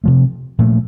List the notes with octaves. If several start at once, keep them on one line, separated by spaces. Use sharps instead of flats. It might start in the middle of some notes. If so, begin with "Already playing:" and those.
C3 F3 A3
A#2 F3 A3